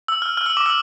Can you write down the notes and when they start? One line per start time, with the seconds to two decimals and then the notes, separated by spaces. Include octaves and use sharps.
0.08 E6
0.22 F6
0.37 F6
0.46 E6
0.57 D6
0.66 E6